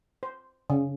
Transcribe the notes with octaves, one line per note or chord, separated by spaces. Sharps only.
C5
C#3